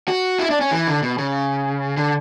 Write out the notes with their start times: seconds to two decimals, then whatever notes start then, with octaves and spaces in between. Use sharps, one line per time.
0.08 F#4
0.39 E4
0.50 D4
0.61 C#4
0.71 E3
0.87 D3
1.03 B2
1.18 C#3
1.97 D3